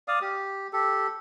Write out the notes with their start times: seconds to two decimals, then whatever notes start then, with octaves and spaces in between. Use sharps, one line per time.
0.08 D5 F5 D#6
0.22 G4
0.73 G4 A4